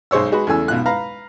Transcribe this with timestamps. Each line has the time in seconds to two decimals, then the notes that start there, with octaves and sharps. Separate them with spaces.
0.11 B1 G#3 C5 C#5 E6
0.32 G#3 F#4 G#4 B4
0.47 E2 C#3 A3 G#5 E6
0.68 B1 B2 F4 F#6
0.86 B4 F5 A#5